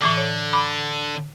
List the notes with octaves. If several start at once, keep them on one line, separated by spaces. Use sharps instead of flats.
A2 D3 E3 D6
C#5
B5 D6